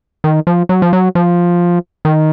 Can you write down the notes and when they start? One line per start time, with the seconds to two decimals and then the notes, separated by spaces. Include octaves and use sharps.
0.24 D#3
0.47 F3
0.69 F#3
0.82 F3
0.93 F#3
1.15 F3
2.05 D#3